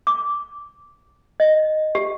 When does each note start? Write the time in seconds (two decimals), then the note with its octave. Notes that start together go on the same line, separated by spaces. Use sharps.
0.07 D6
1.40 D#5
1.95 G4